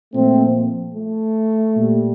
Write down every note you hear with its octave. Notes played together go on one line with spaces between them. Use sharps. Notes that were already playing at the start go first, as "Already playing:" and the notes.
A#2 F3 A3 C4
A3
A#2 G3